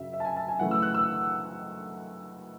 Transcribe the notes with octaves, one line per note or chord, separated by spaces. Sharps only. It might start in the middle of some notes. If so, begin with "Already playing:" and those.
Already playing: F#2 C#3 F#3 E5
E5
A5
G#5
A5
G#5
F#2 C#3 E3 A3 F#5
E6
F#6
E6